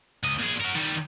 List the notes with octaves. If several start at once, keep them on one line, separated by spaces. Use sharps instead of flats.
C#2 D#5
A#2 G#4
F#4 A#4
D#3 G3